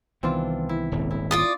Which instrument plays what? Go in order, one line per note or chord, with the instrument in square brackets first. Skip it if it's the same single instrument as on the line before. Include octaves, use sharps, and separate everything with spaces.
[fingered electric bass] C2 D#3 B3 [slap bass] E3 [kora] C4 D4 F4
[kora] E4
[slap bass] D#1 G#1
[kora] E4
[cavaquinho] F4 D5 D#6